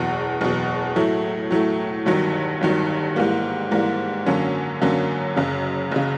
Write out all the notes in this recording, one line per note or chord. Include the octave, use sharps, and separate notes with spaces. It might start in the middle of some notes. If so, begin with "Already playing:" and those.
Already playing: F#1 E2 B2
F#1 E2 B2
A2 F#3 A3
A2 F#3 A3
G1 G2 D#3 F#3
G1 G2 D#3 F#3
G#2 E3 G3 A#3
G#2 E3 G3 A#3
F#2 D3 F#3 A#3 C#4
F#2 D3 F#3 A#3 C#4
F#1 F#2 C#3
F#1 C#3